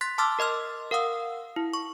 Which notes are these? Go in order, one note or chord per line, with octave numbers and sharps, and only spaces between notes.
C6 F#6 A6 B6
A5 C6 D6 E6 F6 A6
A#4 D#5 C6 F6
A#4 F5 F#5 D#6 E6
E4
C#6